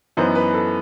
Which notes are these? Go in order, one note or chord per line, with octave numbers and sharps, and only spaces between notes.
F#2 E3 B3 D#4 C5
B4
A4